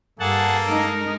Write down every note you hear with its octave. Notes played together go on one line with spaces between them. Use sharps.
G2 A#3 G#4 A4 F#5 A5
G#3 D#4 A#4